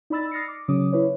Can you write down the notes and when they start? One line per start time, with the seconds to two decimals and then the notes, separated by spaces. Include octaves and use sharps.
0.10 D#4 D5 B5 E6 A6
0.31 D#6 F6 A6 A#6 C7 C#7
0.48 D6
0.68 C#3 F#3 C#4 D6 D#6
0.92 E4 B4 C#5